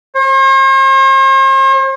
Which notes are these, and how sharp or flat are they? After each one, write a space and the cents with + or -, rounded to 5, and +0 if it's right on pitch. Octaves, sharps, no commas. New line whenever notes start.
C5 +45